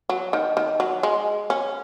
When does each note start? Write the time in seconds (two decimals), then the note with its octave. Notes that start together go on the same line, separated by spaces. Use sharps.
0.09 F#3
0.33 D#3
0.57 D#3
0.80 F#3
1.03 G#3
1.50 C#4